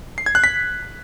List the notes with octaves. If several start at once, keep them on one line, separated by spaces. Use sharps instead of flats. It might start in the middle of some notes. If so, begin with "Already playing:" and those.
C7
G#6
F#6
B6